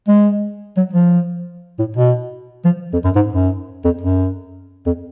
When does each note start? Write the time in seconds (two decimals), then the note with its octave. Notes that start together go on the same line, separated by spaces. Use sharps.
0.08 G#3
0.77 F#3
0.93 F3
1.79 A2
1.97 B2
2.65 F3
2.93 F2
3.04 F#2
3.16 G#2
3.33 F#2
3.85 F2
4.01 F#2
4.86 F2